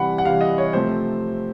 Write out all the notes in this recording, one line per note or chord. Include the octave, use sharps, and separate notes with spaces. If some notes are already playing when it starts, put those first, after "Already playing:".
Already playing: C3 E3 G3 F#5 B5
F#5
C3 E3 G3 F5
D#5
C#5
C3 F3 A3 C4 C5